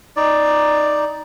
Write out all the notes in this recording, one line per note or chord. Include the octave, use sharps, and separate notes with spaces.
D#4 D5